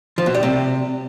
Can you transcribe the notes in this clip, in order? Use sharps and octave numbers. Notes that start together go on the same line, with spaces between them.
F3
B2
G3
C3